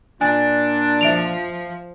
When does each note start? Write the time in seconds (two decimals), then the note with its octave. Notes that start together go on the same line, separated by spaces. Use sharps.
0.21 A#2 D4 G#5
1.01 F3 E5 D7 F7